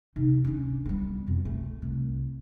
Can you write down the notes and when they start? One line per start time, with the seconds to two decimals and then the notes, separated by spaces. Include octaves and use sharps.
0.16 C3 D#4
0.44 C#4 D4
0.85 G3 B3
1.27 F2 B2
1.45 A3
1.82 C2